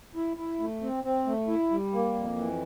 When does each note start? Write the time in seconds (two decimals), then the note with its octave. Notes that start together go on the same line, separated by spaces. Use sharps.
0.15 E4
0.37 E4
0.60 A3
0.82 C4
1.04 C4
1.26 A3
1.48 E4
1.70 G3
1.93 A#3
2.14 F2
2.36 E3